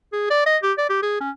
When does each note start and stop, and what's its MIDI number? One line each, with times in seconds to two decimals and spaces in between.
0.13 0.27 68
0.30 0.46 74
0.46 0.57 75
0.63 0.73 67
0.78 0.86 74
0.90 1.01 67
1.03 1.20 68
1.21 1.31 61